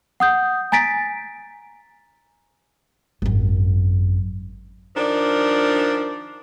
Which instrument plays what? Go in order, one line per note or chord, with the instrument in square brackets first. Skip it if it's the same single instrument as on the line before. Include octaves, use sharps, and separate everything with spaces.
[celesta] F#5 D#6 G6
G#5 A#5 A6 B6 D7
[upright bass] G#1 F#2
[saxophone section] D#3 F3 D4 D5